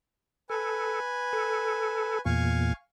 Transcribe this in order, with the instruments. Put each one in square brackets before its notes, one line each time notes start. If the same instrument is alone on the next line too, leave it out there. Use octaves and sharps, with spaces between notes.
[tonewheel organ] A4 [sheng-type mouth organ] B4 G#5
[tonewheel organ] A4
[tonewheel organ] E2 A#2 [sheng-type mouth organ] F5 G#5 C#6